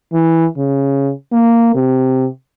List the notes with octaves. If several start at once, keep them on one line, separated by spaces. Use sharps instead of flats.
E3
C#3
A#3
C3